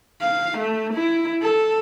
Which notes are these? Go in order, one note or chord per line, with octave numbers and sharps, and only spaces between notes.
F5
A3
E4
A4